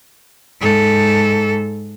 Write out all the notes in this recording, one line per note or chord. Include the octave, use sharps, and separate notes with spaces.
G#2 A4